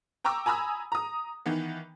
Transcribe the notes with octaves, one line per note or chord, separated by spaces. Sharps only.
G5 A#5 C#6 D6 E6
G#5 A#5 B5 D#6 E6
A#5 D#6
D#3 E3 B3